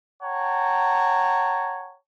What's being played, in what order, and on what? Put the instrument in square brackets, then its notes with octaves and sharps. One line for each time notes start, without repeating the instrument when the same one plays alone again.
[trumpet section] C#5 F#5 G5 A5 A#5